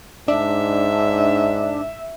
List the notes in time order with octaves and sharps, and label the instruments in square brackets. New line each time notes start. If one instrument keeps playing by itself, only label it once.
[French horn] G#2 [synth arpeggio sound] D4 [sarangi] E5